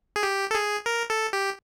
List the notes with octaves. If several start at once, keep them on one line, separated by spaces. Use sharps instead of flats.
G#4
G4
A4
G#4
A#4
A4
G4